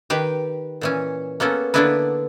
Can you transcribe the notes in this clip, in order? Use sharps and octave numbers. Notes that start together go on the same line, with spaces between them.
D#3 G4 B4
A#2 E3 C#4
A#3 B3 C#4 A4
D3 A#3 B3 D4 E4 B4